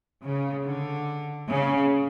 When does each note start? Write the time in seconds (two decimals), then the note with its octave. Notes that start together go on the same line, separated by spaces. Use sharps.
0.23 C#3
0.66 D3
1.50 C#3